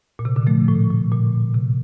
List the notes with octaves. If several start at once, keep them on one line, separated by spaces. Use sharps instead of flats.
A#2
C3
A#2 D3
F3 A3
A2
A#2
A#2
C3